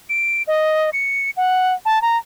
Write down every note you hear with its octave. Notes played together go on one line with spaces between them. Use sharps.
D7
D#5
C#7
F#5
A5
A#5